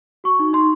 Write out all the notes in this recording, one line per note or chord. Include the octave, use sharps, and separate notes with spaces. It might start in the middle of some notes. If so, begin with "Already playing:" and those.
F#4 C#6
D#4
D#4 C6